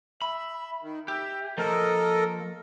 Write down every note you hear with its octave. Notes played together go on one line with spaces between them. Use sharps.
E5 B5
D#3
G4 E5
F3 A#3 A4 A#4 D#5